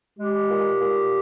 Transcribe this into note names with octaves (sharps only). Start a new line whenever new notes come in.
G#3 G4
A#2
A#2